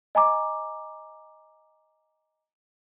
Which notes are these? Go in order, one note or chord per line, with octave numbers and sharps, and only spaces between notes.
D#5 G#5 A#5 D6